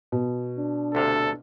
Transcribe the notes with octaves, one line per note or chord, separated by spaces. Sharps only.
B2
D4
D2 C3 A4 F5